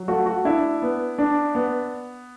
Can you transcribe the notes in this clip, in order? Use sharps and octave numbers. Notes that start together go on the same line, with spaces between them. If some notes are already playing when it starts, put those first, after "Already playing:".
Already playing: F#3
A3 F#4
F#4
D4 E4
B3
D4
B3